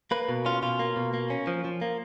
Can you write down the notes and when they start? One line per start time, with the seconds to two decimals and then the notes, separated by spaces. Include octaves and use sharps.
0.11 A#3 B4
0.29 B2
0.45 C#4 F4
0.62 B2 F4
0.79 A#3
0.97 B2
1.14 A#3
1.30 C#4
1.47 F3
1.65 F3
1.82 A#3